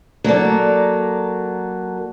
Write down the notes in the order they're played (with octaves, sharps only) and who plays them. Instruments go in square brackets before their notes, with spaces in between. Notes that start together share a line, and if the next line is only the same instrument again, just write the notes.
[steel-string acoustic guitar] F#3 A#3 A4 D5